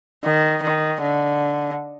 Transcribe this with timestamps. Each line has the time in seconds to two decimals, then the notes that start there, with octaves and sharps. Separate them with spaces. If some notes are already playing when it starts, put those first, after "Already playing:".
0.24 D#3
0.63 D#3
1.02 D3